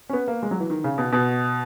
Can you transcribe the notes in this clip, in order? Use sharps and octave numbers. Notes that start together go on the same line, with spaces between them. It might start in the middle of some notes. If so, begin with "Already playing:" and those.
C#4
B3
A#3
G#3
F#3
E3
D#3
C#3
B2
B2